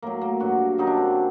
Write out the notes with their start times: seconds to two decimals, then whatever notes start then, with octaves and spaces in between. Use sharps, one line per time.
0.02 A2 F#3 A#3
0.21 A#3
0.40 G2 F#3 F#4
0.78 F#2 D#3 F#3 D#4
0.87 D4
0.97 C4